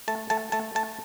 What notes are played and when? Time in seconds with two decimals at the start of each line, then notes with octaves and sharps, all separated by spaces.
0.08 A3 A5
0.30 A3 A5
0.52 A3 A5
0.75 A3 A5